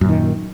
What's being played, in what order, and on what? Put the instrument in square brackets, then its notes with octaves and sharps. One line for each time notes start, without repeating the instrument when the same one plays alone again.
[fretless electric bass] F#2
A#2
D#3